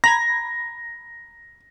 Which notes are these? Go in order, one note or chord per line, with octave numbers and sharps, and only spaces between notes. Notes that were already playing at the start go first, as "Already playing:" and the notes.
A#5 B5 G#6 A#6